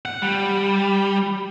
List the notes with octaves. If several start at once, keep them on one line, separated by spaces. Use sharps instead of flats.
F#5
G3